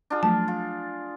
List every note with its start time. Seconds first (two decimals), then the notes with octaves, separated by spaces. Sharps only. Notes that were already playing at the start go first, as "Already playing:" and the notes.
0.10 D4 F4 G#4
0.23 F3 F#3 A3 A5
0.48 F4